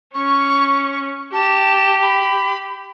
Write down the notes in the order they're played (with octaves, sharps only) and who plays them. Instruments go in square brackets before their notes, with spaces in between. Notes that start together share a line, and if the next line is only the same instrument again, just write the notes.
[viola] C#4 [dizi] C#6
[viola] G4 [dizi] A5
[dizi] B5